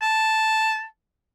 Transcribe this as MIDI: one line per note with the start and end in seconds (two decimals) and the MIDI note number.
0.02 0.85 81